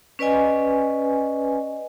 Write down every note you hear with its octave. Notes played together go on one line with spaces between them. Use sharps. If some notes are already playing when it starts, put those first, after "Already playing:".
C#4 B4 D5 D#5 G#5